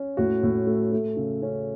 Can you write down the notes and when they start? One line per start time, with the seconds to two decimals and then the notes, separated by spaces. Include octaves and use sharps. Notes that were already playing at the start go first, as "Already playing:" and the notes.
Already playing: C#4
0.17 A2 F#4
0.43 A2
0.67 A3
0.92 A3
1.17 C#3
1.42 C#4